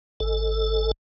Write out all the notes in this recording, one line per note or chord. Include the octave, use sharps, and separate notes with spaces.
G#1 A4